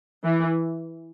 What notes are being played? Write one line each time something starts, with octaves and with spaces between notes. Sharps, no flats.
E3